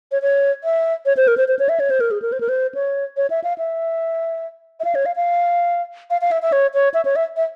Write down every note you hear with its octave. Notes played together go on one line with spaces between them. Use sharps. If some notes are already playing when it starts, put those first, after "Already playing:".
C#5
C#5
E5
C#5
C5
A#4
C5
C5
C#5
E5
C#5
C5
A#4
G#4
A#4
C5
A#4
C5
C#5
C#5
E5
F5
E5
E5
F5
C#5
F5
F5
F5
F5
E5
E5
C#5
C#5
E5
C#5
E5
E5